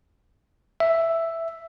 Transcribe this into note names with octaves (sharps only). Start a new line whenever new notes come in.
E5